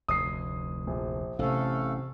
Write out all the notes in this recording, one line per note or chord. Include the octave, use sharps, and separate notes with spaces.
F1 D2 D#6 C7
A#1
A1 C3 A3 C#4 A4 F5